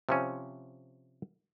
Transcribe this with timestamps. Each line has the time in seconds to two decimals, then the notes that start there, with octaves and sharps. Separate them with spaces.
0.09 C3 F3 C#4